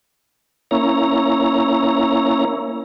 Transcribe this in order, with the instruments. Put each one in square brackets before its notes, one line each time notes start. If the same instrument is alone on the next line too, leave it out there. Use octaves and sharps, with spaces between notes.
[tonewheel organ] A#3 C#4 E4 C#5 A#5